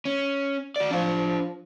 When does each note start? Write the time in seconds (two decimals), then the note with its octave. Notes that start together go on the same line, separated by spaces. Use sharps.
0.05 C#4
0.76 F#4 D5
0.91 F3 D4 F5